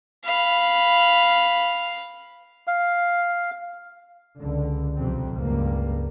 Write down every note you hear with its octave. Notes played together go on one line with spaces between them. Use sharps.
F5 B5
F5
C#2 D3
B1 F2 C3 C4
C#2 G2 G3 A#3